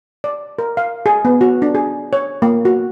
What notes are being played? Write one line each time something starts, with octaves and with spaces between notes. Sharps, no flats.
D5
A#4
F5
G#4
B3
F#4
D4
G#4
C#5
A#3
F#4